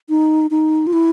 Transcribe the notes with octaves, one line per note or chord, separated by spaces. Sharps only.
D#4
D#4
F4
E4